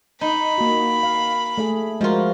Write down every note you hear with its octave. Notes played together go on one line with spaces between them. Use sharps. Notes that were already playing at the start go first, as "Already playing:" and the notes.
D#4 B5
A#3 F#4
F5
A3 G#4
F3 G#3 F4 F#4 A#4